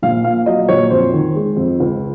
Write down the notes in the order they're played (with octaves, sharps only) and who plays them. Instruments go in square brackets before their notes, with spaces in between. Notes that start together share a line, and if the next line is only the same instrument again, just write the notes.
[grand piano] A#1 F5
A#2 F5
F#3 D#5
A#1 C#5
F2 C5
D#3
G#3
F2
C#2